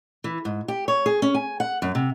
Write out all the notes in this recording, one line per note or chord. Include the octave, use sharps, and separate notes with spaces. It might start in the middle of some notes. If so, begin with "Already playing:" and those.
E3
G#2
G4
C#5
G#4
C#4
G#5
F#5
F#2
C3